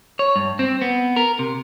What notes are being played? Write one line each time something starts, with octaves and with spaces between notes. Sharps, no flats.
C#5
G2
C4
B3
A#4
C3